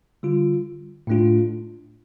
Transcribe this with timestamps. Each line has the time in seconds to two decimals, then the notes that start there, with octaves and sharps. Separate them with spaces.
0.23 D3 G3 F4
1.07 A2 A3 D4 F4